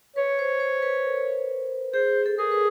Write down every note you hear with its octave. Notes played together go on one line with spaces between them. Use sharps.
B4 C#5
C5
C5
B4
A#4
G#4 C5
A4
G#4 A#4
B4